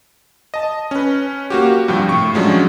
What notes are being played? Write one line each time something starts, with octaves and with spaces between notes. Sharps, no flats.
D#5 A5
C#4 B4
A#3 F#4 G4
G2 C3 F3 G5
A2 C#6
F3 F#3 G#3 C#4 D4